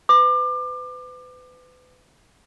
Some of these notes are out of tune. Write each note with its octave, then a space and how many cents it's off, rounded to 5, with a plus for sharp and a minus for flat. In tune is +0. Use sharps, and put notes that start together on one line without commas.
B4 +35 D6 +30